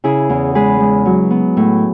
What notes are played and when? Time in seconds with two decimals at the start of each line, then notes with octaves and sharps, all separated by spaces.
0.04 C#3 E4 G#4
0.29 E2
0.55 G#3 G#4 B4
0.80 G#3
1.06 F#3
1.31 B3
1.57 A2